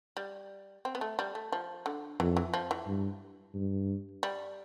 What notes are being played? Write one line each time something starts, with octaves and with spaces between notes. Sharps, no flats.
G3
C4
B3
A3
G3
A3
F3
D3
F2 E3
E3
F3
E3
G2
G2
G3